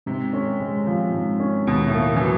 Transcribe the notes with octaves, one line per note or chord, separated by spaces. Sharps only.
G#2 C3
C#4
G#3
F3
G#2
C#4
D#2 B2
A2
A#3
E3 F#3